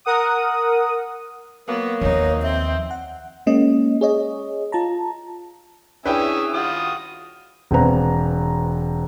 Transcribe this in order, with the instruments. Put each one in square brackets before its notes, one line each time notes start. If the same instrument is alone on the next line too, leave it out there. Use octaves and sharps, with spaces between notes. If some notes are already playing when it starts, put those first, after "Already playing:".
[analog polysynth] A#4 F#5 D#6
[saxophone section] F#3 A#3 B4 [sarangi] B3
[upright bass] D#2 F3 [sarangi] D#4 [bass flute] C#5
[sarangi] C4 [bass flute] E5
[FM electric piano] F#5
G#3 A#3 C#4 D#5
G#4 C#5 D#5
F4 A5 A#5
[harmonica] C#4 E5 [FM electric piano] D4 E4 [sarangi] G#4 [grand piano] B4 G5
[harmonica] F4 D#6 [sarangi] F#4
[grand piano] E1 C4 B4 A#5